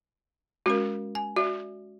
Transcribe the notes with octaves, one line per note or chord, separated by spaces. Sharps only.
G#3 C#4 F#4 A#4
G#5
F#4 D5 E5